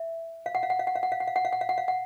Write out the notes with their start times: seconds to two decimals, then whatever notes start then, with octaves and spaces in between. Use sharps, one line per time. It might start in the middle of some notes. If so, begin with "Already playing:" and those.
Already playing: E5
0.46 F5
0.55 F#5
0.63 F5
0.70 F#5
0.79 F5
0.87 F#5
0.96 F5
1.03 F#5
1.12 F5
1.20 F#5
1.27 F5
1.36 F#5
1.45 F5
1.53 F#5
1.61 F5
1.69 F#5
1.78 F5
1.88 F#5